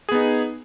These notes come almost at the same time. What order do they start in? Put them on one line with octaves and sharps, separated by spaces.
G#4 B3 D#4